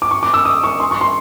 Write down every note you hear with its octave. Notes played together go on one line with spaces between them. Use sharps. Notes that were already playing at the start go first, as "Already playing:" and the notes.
D6
C#6
D6
E6
D#6
C#6
C6
C#6
C6